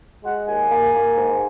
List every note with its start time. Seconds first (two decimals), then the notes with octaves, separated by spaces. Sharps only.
0.24 G#3 F#5
0.47 D#2 G#5
0.70 A#3
0.95 A#3
1.17 G#2